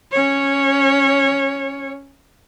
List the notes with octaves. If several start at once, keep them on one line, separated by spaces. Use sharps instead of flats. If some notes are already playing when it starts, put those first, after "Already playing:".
C#4 C#5